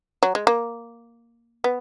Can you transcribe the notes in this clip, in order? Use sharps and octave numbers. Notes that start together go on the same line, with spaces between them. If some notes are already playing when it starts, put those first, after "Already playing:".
F#3
G#3
A#3
B3